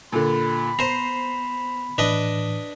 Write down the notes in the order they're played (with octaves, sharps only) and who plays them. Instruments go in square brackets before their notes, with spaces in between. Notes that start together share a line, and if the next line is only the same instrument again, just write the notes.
[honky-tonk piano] A#2 D3 [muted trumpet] B5
[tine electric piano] B3 [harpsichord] C5 A#5 [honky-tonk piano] C7
[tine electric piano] A2 E3 [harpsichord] D4 B4 D#5